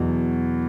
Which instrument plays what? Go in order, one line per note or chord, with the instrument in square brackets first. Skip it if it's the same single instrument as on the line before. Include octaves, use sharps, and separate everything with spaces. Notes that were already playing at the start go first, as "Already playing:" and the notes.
Already playing: [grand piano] E2 B2 F#3